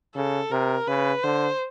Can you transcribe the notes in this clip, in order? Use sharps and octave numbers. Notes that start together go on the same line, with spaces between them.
C#3 A4
C3 A#4
C#3 B4
D3 C5